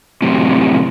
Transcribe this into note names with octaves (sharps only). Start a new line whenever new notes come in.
F#2 A2 C3